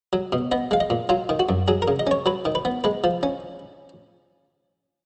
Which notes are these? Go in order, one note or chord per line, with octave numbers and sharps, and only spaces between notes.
F#3
B2
B3 D#5
G#3 F5
D#5
A#2
F#3 F4
D#3
F#4
F#2
F#3 G#4
A#4
C#3
D#5
C#4 C#5
F#3 B4
D#3
B4
B3
G#3 B4
F3
C#4